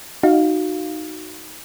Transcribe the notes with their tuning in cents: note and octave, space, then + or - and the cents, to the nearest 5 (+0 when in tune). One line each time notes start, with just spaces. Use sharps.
D#4 -10 F#4 +0 F5 +0